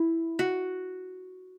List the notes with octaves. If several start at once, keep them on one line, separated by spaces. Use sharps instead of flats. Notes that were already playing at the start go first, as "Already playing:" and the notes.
Already playing: E4
F#4